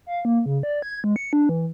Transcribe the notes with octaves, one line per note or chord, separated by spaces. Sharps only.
F5
A#3
C#3
D5
G#6
G#3
C#7
D4
E3